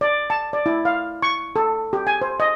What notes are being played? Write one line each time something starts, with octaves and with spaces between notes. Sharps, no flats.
D5
A5
D5
E4
F5
C#6
A4
G4
G#5
C5
D#5